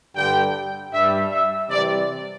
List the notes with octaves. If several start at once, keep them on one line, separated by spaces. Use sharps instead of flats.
G2 D3 G3 G5
G2 G3 E5
E5
C3 E3 G3 D5